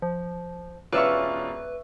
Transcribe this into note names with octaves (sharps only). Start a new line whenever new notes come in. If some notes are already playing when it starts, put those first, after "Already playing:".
F3
E1 C#4 F4 B4 D5 E5 C#6